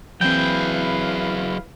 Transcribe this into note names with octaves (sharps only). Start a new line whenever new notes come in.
E3 F#3 C4 E4 G#4 B4 F5 G5